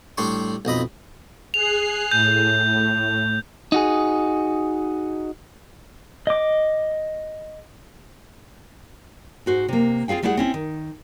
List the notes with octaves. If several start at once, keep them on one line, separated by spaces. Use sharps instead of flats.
A2 G3 D4 C6 C#6
B1 F2 D#5 B5
G#4 F#6 C7 F7
A2 G6
D#4 F#4 G#4
D#5 D6
G#2 F#4 C5
C3 A#3
C4 F4 G#4 F5 G5
G3 A3 E4 G#4 F#5
C4 C#4 E4
D#3